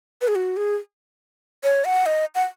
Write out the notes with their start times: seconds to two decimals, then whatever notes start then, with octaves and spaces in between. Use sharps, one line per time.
0.21 B4
0.28 G#4
0.35 F#4
0.57 G#4
1.64 C#5
1.85 F#5
2.06 D#5
2.35 F#5